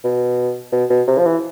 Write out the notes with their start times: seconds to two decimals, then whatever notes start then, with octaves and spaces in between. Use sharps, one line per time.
0.04 B2
0.72 B2
0.90 B2
1.07 C3
1.18 F3
1.25 E3